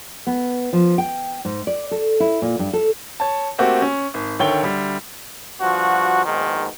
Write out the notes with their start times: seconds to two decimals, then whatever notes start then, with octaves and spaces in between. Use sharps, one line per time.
0.27 B3
0.73 F3
0.98 G5
1.45 G#2
1.67 D5
1.91 A4
2.20 E4
2.42 A#2
2.59 G2
2.73 A4
3.20 C#5 A5
3.58 A3 A#3 C4 F#4 G4
3.82 C#4
4.14 G#1
4.39 D2 D#3 A4 C#5 G5 G7
4.63 D2 G3
5.61 G2 F3 F#4
6.26 A#1 G#2 B2 D#3